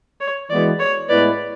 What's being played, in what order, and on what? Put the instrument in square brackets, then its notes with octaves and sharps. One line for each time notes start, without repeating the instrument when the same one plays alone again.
[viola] C#5
[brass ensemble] E3 G#3 B3 F#4 [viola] D5
[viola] C#5
[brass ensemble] A2 G#3 B3 E4 B4 [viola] D5